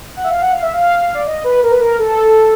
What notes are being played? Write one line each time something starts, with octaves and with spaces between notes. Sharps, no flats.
F#5
E5
F5
F#5
F5
E5
F5
D5
D#5
B4
A#4
B4
A#4
A4